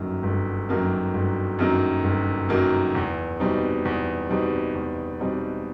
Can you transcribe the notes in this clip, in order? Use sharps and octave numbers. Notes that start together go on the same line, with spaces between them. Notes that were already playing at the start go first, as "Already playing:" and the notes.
Already playing: G1 F#2 D#3 F#3 A#3
G1
F#2 D#3 F#3 A#3
G1
F#2 D#3 F#3 A#3
G1
F#2 D#3 F#3 A#3
E2
B2 G3 C4 D#4
E2
B2 G3 C4 D#4
E2
B2 G3 C4 D#4